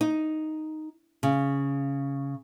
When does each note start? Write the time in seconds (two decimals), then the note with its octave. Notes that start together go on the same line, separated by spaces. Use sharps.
0.01 D#4
1.23 C#3